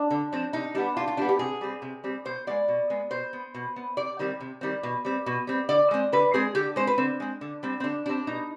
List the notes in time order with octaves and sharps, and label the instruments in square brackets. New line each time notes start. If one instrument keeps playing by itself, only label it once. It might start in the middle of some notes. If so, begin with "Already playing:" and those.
Already playing: [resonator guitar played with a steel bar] D4
D3
F3 C4
C3 D#4
G3 B3 D4
C3 F4
F4
G3 B3 D4
G4
C3 G#4
G3 C4
C3
G3 C4
B2 C5
G#3 B3 D5
B2
G#3 B3
B2 C5
B3
B2
B3
C3 D5
D#3 G3 C4
C3
D#3 G3 C4
B2
G3 C4
B2
G3 C4
D3 D5
G#3 C4
D3 B4
G#3 C4 G#4
D3 G4
G#3 C4 C5
B4
D3 C4
G#3 C4
D3
G3 C4
C4
D3 D4
G3 C4 D4
B2 D#4